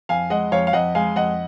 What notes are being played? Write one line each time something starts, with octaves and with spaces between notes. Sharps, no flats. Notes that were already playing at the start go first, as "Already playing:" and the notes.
F2 F5 G#5
G#3 D#5 F#5
F2 C#5 F5
F5
F2 D#5 F#5
G#3 F5 G#5
F2 D#5 F#5